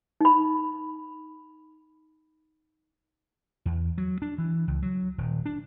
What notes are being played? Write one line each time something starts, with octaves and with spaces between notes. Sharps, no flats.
D#4 B5
E2
F#3
D4
E3
C#2
F#3
D#1
D4